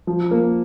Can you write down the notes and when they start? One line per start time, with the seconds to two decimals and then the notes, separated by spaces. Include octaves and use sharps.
0.07 F3
0.31 A#3